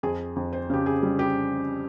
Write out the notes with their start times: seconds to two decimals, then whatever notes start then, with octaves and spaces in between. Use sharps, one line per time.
0.03 F2 G#4
0.36 F2
0.53 C5
0.70 C#3 G4
0.86 G#4
1.03 G3
1.19 G4